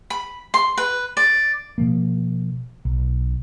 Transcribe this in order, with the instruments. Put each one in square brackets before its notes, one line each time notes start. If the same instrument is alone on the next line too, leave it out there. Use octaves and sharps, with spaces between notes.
[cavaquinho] B5
C6
B4
D5
[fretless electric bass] B2 F3 A#3
B1